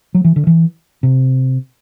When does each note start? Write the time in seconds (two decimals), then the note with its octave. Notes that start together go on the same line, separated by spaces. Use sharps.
0.14 F#3
0.24 E3
0.36 D3
0.47 E3
1.03 C3